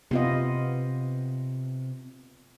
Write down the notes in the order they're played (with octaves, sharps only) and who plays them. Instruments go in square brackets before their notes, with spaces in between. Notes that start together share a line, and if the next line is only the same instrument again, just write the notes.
[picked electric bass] C3 [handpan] B3 F4 D#5